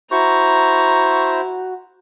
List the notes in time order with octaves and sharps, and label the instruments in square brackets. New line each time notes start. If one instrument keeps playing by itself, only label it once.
[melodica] E4 C5 [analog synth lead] F#4 [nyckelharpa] A#5 [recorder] C#6